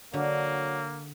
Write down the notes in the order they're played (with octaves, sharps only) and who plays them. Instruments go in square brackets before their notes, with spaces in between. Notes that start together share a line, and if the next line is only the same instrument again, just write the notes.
[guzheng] D3 [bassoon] F#3 [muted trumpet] A#3